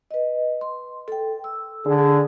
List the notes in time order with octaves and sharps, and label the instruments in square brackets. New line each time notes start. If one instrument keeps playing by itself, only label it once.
[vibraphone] B4 D#5
C6
A4 G5
E6
[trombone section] D3 G#4